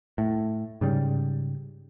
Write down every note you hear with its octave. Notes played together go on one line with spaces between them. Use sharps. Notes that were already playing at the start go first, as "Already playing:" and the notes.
A2
G#2 C#3 G3